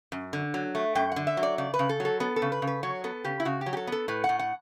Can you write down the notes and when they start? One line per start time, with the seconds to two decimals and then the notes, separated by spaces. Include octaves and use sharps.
0.12 F#2
0.33 D3
0.54 F#3
0.75 A3
0.95 F#2 G5
1.12 D3 F#5
1.27 E5
1.37 F#3
1.43 D5
1.58 C#3 D5
1.74 B4
1.79 C#3
1.89 A4
2.00 F#3 A4
2.20 B3 A4
2.36 A4
2.42 C#3
2.52 B4
2.62 C#3
2.67 B4
2.83 F#3 C#5
3.04 B3 A4
3.24 C#3 G4
3.40 E4
3.45 C#3 F#4
3.61 G4
3.66 F#3
3.73 G4
3.77 A4
3.87 B3 A4
4.08 A2 B4
4.24 F#5
4.29 A2
4.39 F#5